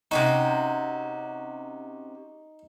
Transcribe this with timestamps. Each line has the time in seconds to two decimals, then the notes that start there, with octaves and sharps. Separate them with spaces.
0.11 C3 C#4 D#4 F#4